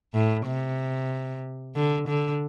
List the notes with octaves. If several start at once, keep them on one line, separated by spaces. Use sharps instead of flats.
A2
C3
D3
D3